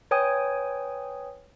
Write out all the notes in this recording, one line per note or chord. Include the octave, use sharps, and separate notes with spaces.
B4 C#5 G5 G#5 D#6